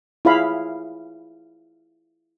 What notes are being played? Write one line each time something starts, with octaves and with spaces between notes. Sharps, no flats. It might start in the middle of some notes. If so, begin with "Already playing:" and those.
E4 F4 G#4 C#5 F5 B5